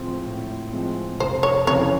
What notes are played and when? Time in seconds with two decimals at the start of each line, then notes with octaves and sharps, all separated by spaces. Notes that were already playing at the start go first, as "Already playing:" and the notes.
Already playing: A2 F3 G#3 C4
0.25 A2
0.72 F3 G#3 C4
1.20 F1 C5
1.43 C#5
1.67 F2 C#3 E3 C#5